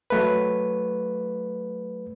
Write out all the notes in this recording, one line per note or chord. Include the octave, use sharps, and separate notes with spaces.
F#3 A3 B4